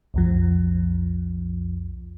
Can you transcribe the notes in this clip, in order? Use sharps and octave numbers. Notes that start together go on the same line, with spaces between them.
B1 F2 F3